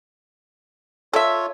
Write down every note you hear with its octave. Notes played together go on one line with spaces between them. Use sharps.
F4 A4 C#5 E5